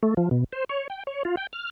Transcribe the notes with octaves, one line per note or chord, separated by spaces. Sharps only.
A3
F3
B2
C5
C#5
G5
C#5
F4
G5
F6